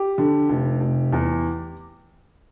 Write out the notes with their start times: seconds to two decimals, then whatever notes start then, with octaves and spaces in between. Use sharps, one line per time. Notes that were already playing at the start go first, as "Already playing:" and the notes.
Already playing: G4
0.18 D3
0.50 F1
0.81 F1
1.13 E2